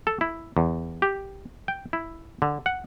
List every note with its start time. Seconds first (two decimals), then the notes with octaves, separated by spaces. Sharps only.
0.07 A4
0.21 E4
0.57 E2
1.02 G4
1.68 G5
1.93 E4
2.42 D3
2.66 F#5